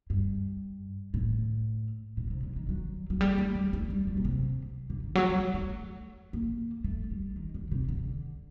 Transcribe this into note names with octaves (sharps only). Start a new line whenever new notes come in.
G2
A2
A#2
C3
D3
D#3
F#3
F#3
G3
A3
G3
A3
G3
F#3
A#2
C3
D3
D#3
F#3
G3
A3
A#3
A3
G3
D#3
D3
C3
D3